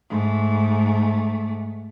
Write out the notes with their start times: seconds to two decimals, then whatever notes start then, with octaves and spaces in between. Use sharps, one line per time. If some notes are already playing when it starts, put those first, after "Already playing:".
0.10 G#2 A3